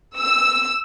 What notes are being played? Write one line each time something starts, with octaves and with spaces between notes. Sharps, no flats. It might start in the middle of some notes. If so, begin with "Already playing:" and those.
E6